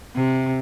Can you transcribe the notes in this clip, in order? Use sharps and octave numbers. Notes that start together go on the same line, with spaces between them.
C3